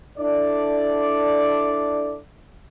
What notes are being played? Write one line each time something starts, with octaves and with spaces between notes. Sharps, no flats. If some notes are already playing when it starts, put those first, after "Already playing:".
D4 E4 A4 D5